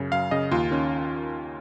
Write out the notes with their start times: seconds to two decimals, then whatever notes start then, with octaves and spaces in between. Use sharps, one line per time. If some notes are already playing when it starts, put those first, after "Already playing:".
Already playing: F#2 C#3
0.12 F#2 F5
0.31 C#3 D#5
0.51 D#2 F4
0.71 D#3 C#4